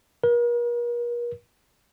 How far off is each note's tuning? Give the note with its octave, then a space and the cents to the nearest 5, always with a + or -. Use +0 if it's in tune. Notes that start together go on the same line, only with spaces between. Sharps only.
A#4 +45